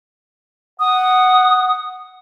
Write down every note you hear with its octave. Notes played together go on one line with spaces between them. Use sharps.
F#5 D#6